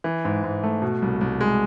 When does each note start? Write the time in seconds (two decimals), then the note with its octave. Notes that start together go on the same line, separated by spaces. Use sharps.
0.04 E3
0.25 G#2
0.44 G#2
0.64 A3
0.82 B2
1.02 C2
1.21 C2
1.41 G#3